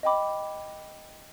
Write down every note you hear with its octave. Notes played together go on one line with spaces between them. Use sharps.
D#5 G5 B5 D6